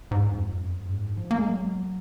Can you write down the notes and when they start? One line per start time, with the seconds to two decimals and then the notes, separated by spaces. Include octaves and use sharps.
0.11 G#2
0.31 F2
0.60 F#2
0.89 G#2
1.17 F3
1.31 A#3
1.38 G#3
1.47 F#3